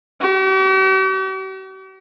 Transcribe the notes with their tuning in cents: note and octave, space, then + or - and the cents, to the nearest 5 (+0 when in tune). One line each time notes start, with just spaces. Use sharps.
G4 -45